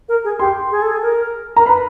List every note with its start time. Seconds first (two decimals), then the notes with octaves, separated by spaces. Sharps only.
0.09 A#4
0.24 G#4
0.39 G4 C6
0.71 G#4
0.82 A4
0.92 G#4
1.02 A#4
1.56 A#4 A#5
1.66 B4 B5